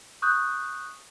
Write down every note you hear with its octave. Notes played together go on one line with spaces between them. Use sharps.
C#6 D#6 F#6 G6